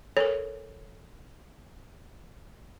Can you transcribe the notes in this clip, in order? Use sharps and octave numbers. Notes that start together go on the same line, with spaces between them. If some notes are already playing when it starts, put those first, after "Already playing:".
A4 A#4 C#5